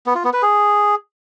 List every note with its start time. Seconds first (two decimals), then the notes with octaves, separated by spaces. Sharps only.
0.06 B3
0.15 F4
0.24 B3
0.33 B4
0.42 G#4